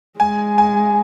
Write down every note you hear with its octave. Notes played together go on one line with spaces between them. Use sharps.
G#3 G#5
G#5